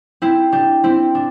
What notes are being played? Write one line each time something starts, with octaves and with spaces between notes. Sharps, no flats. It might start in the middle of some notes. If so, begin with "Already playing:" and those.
C4 E4
D4 G4
C4 E4
D4